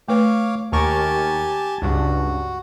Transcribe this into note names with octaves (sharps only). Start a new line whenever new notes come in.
A3 B4 C#5 F5 D6
D#2 G4 A#4 G#5 A5 C#6
C#2 G2 F#4